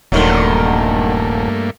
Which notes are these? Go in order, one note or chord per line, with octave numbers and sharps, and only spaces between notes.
D#1 G2 D3 D#3 F#3 A3 A#3